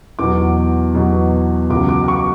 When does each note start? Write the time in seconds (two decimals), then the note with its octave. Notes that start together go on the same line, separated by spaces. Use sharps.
0.19 E2 B2 F#3 D6
0.95 E2 B2 F#3
1.70 C#2 C#3 F#3 D6
1.89 D6
2.08 C#6